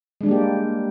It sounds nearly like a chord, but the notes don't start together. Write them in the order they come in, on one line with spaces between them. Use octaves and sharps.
G#3 D4 G3 A#3 G4